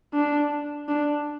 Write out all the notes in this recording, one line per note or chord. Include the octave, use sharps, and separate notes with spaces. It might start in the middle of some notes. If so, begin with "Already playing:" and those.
D4
D4